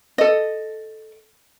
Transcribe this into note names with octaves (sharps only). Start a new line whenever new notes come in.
A4 D#5